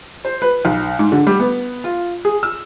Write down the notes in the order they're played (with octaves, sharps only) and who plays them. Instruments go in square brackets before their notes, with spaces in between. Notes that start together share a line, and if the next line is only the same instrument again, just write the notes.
[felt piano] C5
B4
B1
G#2
D3
G3
B3
F4
G#4
E6